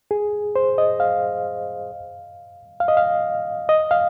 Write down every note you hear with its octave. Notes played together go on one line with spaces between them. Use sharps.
G#4
C5
D#5
F5
F5
D#5
F5
D#5
F5